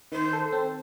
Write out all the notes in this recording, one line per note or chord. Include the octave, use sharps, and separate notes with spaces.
D#3 C5
A4
C4